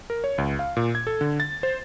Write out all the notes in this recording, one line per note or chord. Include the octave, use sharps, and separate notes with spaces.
A#4
C#5
C#2
F5
A#2
G#6
A4
D3
A6
C5